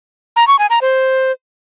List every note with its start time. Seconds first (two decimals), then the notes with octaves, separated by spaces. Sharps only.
0.36 A#5
0.48 C#6
0.59 G#5
0.70 A#5
0.81 C5